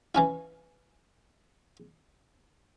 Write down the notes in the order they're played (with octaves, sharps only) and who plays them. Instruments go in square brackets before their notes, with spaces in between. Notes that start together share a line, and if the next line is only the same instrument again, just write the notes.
[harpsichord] E3 C#4 E4